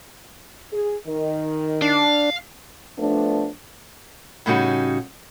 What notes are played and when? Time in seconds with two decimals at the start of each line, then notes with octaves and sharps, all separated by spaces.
0.73 G#4
1.07 D#3
1.82 D4 F5
2.97 F3 A3 B3 D4
4.46 A2 C#3 G3 C#4 D#4 F#4